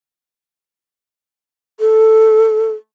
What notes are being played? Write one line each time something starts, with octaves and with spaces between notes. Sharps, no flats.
A4